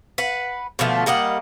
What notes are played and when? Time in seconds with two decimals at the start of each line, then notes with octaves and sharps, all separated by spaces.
0.18 B4 F#5
0.79 B2 D3 F3 A3
1.06 G3 A#3 D#5 F#5